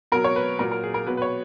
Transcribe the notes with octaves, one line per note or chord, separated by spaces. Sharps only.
B2 F#3 A#4
C#5
B4
A#2 F#3 A#4
A#4
G#4
A#4
B2 F#3 B4
B4
C#5